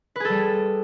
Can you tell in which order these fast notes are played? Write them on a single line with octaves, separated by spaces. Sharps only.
B4 G#4 A4 G3